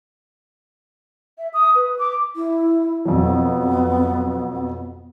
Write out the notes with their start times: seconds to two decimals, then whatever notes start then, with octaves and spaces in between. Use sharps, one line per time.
1.38 E5
1.54 D#6
1.75 B4
1.99 D6
2.36 E4
3.05 F2 B2 F#3 B3